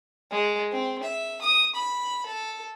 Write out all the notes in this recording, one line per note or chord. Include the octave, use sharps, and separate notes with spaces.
G#3
C4
E5
D#6
B5
A4